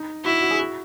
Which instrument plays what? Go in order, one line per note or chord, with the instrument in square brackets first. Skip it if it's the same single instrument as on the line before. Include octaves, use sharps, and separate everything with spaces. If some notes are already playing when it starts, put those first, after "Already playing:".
Already playing: [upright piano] D#4
[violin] E4 [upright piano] F#4
[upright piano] F#4
G#4
F#4